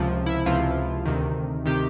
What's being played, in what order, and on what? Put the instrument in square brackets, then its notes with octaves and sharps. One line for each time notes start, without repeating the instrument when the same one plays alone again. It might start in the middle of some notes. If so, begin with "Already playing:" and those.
Already playing: [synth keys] C#2 C3 F3
E4
C#2 C3 F3 F4
D2 C3 D#3
C3 D#3 G4